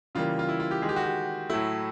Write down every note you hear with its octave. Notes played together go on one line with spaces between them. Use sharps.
C#3 E3 G3 A#3 F4
F4
E4
F4
G4
D#3 G#3 G#4
G4
F#4
G4
A2 F#3 A3 E4